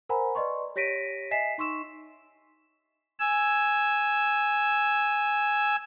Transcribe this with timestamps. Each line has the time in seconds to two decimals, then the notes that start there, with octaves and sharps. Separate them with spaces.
0.09 A#4 C5 F#5 G#5 A#5 B5
0.35 B4 D5 D#5 C6 C#6
0.76 G4 C#5 A#6 B6 D7 D#7
1.31 D#5 E5 G#5 B6 C7 E7
1.58 D#4 C6 C#6 E6 E7
3.20 G#5 E6